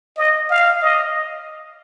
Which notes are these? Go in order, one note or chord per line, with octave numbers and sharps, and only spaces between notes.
D#5
F5
D#5